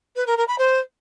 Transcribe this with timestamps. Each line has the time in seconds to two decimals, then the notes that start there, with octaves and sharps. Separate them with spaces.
0.16 B4
0.27 A#4
0.37 A#4
0.48 B5
0.58 C5